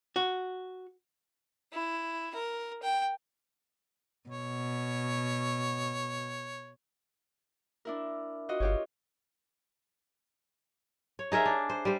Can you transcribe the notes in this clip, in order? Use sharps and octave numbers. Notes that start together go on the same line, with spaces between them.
F#4
E4
A#4
G5
B2 C#5
D4 E4 A#4
F4 F#4 D#5
G1 F4 G4 C#5
C#5
D#4 G#4 A#4 E5
D4
C5
G3 C5